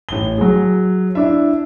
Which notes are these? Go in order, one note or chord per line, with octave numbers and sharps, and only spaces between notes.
A1 G7
F#3 G#4
D4 E4 E5